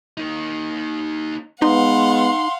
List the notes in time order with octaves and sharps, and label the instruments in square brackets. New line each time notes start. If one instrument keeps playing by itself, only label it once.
[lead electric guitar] A#3 D#4
[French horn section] G#3 B3 [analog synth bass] D#4 [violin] F5 F#5 [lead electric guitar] C6